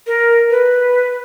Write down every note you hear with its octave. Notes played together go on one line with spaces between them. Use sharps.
A#4
B4